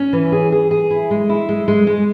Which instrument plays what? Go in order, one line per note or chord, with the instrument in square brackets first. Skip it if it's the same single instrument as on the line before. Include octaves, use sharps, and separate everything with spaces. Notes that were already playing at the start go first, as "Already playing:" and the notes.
Already playing: [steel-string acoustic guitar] C#4
E3
G#4
G#4
G#4
E4
G#3
E4
G#3
G#3
G#3